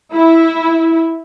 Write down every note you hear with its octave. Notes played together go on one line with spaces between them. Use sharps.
E4